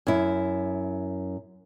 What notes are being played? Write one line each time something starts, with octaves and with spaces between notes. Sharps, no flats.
F#2 E4